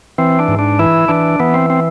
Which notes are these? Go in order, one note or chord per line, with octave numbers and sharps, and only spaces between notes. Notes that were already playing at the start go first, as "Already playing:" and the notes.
E3 C4
D4
G#2
D4
E3 E4
E3 D4
E3 B3
C4
C4